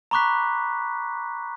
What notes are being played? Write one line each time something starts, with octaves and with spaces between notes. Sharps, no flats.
A#5 B5 C#6 D6 F#6 B6